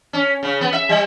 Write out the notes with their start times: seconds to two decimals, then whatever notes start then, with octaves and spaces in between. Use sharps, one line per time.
0.13 C#4
0.43 C#3
0.61 B3
0.72 E5
0.89 G3